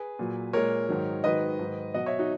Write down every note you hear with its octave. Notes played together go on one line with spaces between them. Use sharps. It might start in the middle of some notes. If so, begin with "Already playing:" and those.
Already playing: G#4 B4
A#2 F#3
A#2 G#3 A#4 C#5
G#2 D#3 F#3
G#2 D#3 F#3 B4 D#5
G#2 D#3 F#3
B2 F#3 D#5 F#5
C#5 E5
D#4 F#4